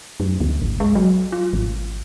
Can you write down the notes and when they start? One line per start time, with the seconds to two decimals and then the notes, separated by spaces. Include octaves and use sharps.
0.20 F#2
0.40 D2
0.62 G#1
0.80 G#3
0.95 F#3
1.32 F4
1.53 G#1